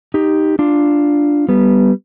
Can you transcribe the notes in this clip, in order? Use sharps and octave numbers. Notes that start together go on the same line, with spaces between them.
D#4 G4
D4 F4
G3 B3